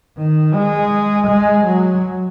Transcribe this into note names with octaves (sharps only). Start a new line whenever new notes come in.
D#3
G#3
G#3
F#3